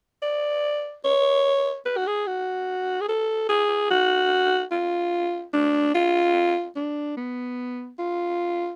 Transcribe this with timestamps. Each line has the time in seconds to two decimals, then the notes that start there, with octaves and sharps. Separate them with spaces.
0.23 D5
1.05 C#5
1.86 B4
1.97 F#4
2.07 G#4
2.27 F#4
3.01 G#4
3.09 A4
3.49 G#4
3.90 F#4
4.71 F4
5.54 D4
5.94 F4
6.76 D4
7.17 B3
7.99 F4